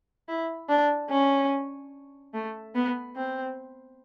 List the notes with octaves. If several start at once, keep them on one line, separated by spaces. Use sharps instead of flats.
E4
D4
C#4
A3
B3
C4